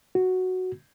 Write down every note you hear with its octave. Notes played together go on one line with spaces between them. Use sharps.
F#4